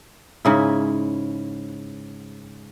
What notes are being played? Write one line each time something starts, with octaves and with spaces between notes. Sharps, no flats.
G#2 C#3 E4